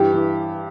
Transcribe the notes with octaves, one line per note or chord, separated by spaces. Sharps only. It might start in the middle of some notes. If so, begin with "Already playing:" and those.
Already playing: G2 E3 G4
E3